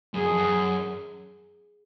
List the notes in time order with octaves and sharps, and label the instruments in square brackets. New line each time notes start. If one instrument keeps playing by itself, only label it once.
[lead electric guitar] F#2 [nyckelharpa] G#4
[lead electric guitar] F2
F#2